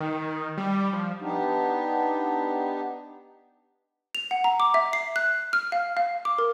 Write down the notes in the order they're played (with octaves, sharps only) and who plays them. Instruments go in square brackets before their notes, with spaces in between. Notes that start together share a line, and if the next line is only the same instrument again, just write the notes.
[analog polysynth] D#3
G3
F3
[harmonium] B3 D4 D#4 G4
[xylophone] F7
F#5
A#5
D6
E5
C7
F#6
F6
F5
F5
D6
A#4